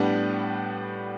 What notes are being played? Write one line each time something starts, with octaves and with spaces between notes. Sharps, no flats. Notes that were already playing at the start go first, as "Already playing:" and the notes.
Already playing: A2 G3 B3 D4